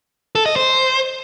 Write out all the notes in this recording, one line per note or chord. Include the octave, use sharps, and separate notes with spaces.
A4
D#5
C5